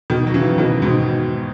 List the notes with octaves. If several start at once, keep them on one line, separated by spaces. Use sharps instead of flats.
B2 D#3
F#3
C#3 E3
B2 D#3
G#2 B2